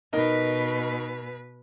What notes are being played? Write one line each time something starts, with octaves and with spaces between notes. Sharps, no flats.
B2 D#4 A#4 B4